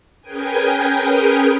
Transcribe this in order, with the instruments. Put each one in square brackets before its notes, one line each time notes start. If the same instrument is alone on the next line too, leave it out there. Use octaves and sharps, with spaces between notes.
[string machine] C#4 G#4 A#4 B4 G5 G#5